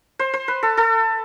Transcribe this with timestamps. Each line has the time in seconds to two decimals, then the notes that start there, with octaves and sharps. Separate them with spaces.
0.19 C5
0.33 C5
0.48 B4
0.63 A4
0.77 A4